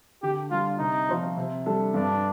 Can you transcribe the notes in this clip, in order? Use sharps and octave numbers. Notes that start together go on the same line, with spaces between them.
D3 G4
G3 D4 F4
C3 D#4
F3 C4 F4
C3
G3 D4 A4
G2 D4